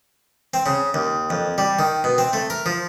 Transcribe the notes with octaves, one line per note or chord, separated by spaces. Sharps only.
C4
C#3
D#2
F2
G3
D#3
B2
C4
A3
A#4
F3